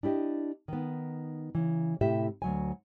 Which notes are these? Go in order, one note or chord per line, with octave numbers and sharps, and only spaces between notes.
D4 E4 G4 D#5
D#3 B3
C#3 E3
A2 C3 E4 G4 E5
D2 F#3 G#5